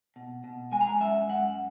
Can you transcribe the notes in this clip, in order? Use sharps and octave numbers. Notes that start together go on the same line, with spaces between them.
B2
B2
G#3 G#5
A#5
G#5
F#2 E5
F#2 F#5